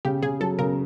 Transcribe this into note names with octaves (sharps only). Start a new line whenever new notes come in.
C#3 G4
C#3 G#4
F#3 A4
C#3 A#4